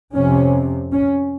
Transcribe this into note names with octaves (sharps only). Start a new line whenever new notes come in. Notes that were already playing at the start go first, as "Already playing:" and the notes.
F2 C3 C#4
C#4